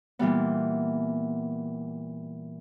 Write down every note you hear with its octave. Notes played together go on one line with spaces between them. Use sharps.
A#2 E3 G3 B3